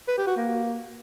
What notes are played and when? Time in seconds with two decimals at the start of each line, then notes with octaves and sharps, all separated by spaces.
0.08 B4
0.17 G4
0.27 F#4
0.37 A#3